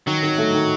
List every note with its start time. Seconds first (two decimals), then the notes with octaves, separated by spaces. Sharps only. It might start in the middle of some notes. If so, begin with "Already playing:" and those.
0.07 D#3 F#3
0.23 D#3
0.38 A3
0.54 D#3